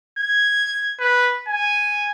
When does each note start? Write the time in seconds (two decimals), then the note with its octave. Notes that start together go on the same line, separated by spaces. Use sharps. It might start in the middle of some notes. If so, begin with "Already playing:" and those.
0.19 G#6
1.00 B4
1.48 G#5